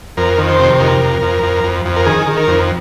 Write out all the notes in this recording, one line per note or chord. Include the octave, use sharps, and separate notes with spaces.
F2 A#4
D#3
C5
C3
F2 A#4
F2
F2
F2
F2
F2
A#4
D#3 G#4
D#3
A#4
F2